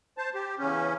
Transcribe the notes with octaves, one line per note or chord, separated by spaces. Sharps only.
C5 A5
G4
E2 C#3 C#4